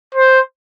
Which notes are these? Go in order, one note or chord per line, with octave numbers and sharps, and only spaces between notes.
C5